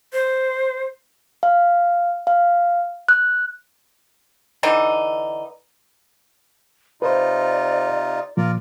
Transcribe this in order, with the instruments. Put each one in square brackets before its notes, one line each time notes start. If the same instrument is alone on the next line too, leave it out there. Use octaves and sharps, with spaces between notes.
[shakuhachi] C5
[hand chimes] F5
F5
F#6
[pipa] D3 E3 D#4
[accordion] C3 D#4 F4 [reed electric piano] B4 C5 [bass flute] D5
[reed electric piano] A#2 F3 [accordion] F4 A#4 D5